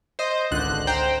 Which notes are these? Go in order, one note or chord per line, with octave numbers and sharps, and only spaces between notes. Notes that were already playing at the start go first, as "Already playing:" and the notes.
C5 D#5
G#1 C#2 D3 F#6
C5 G5 A#5